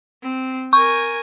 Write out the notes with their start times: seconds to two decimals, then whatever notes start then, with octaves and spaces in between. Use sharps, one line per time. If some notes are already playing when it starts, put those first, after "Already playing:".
0.23 C4
0.73 A#4 G#5 C#6